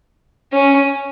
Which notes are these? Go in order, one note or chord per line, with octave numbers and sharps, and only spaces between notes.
C#4